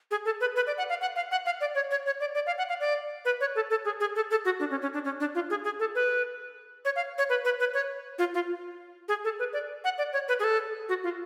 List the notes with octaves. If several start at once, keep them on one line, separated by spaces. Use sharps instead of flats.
G#4
A4
B4
B4
D5
F#5
F5
F#5
F5
F#5
F5
D5
C#5
C#5
C#5
D5
D5
F5
F#5
F5
D5
B4
C#5
A4
A4
G#4
G#4
A4
A4
F#4
D4
C#4
C#4
D4
C#4
D4
F4
G#4
G#4
A4
B4
C#5
F5
C#5
B4
B4
B4
C#5
F4
F4
G#4
A4
B4
D5
F#5
D5
C#5
B4
G#4
A4
F#4
F4